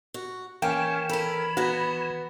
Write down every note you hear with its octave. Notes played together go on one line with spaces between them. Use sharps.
F#4
E3 A#3 C#4 G5 E7
A4 A#4 B5
B3 F#4 A#5